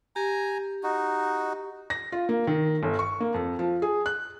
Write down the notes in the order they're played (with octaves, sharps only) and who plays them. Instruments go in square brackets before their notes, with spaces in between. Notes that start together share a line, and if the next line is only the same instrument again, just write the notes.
[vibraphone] G4 [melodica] G#5 A#5
[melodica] D#4 F#4
[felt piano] A#6
F4
A#3
D#3
G1
C#6
A#3
F2
F3
G#4
F#6